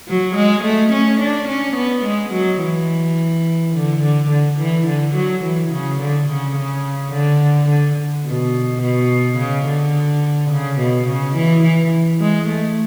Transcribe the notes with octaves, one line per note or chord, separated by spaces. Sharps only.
F#3
G#3
A3
C#4
D4
C#4
B3
G#3
F#3
E3
D3
D3
D3
E3
D3
F#3
E3
C#3
D3
C#3
C#3
D3
D3
B2
B2
C#3
D3
C#3
B2
C#3
E3
E3
G#3
A3